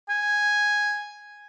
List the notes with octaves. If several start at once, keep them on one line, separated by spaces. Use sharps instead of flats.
G#5